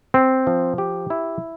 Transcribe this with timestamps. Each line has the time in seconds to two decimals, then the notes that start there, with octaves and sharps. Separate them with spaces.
0.14 C4
0.47 F3
0.78 G4
1.10 E4